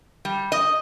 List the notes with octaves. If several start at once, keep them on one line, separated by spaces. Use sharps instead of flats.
G3
D#5